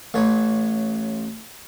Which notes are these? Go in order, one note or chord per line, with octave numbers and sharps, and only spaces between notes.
A1 C#5